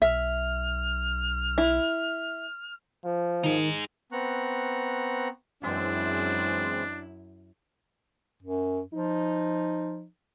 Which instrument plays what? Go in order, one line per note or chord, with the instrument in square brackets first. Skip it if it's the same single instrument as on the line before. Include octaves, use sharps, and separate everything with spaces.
[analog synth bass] B1 [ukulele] E5 [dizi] F6
[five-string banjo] E4
[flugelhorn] F3
[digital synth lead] D#3 [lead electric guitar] D#4 G#4
[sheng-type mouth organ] B3 C4 A#5 C#6 F#6
[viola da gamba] F#2 E4 [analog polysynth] E3 G#3 C4 [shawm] D4
[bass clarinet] F#2
[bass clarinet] F3 [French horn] D#4